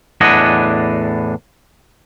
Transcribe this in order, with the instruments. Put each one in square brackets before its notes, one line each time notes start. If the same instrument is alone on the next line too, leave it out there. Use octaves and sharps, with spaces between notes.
[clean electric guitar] E2 A2 D4 D#5 F#5 G#5